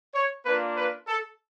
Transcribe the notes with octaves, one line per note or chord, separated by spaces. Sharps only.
C#5
A#3 D4 F4 B4
B4
A4